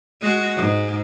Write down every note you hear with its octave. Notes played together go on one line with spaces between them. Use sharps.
G#3 F#4
G#2